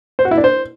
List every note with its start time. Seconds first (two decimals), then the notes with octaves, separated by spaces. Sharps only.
0.19 C5
0.25 F#4
0.31 E4
0.38 D4
0.44 C5